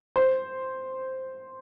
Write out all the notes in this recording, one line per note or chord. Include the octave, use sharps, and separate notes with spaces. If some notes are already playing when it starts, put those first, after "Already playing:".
C5